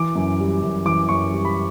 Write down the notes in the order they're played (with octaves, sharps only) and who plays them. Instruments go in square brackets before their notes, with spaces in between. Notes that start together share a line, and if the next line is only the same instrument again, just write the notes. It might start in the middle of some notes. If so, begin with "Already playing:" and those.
Already playing: [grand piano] E3 D6
F#2
G3
F#2
E3 D6
F#2 C#6
G3
B5